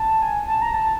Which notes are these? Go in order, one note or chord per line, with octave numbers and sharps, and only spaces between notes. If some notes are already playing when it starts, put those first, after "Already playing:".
Already playing: A5
G#5
A5
A#5
A5